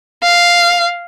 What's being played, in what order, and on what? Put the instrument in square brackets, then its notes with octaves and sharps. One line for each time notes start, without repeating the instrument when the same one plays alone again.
[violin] F5